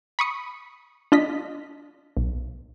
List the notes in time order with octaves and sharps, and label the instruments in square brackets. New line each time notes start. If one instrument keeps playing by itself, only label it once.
[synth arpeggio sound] B5 C#6 D#6 C#7
D4 F4 D#5 B6
B1